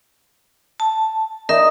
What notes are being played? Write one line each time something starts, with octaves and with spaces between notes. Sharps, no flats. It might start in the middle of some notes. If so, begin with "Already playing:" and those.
A5
D#4 A#4 D#5 E5